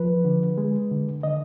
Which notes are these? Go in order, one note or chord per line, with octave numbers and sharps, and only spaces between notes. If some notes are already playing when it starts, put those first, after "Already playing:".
Already playing: F3 B4
D3
G#3
D3
D3 D#5